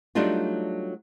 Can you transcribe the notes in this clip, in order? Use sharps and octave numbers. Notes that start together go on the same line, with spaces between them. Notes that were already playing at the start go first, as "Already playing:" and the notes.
F#3 G3 A3 D4 D#4 F4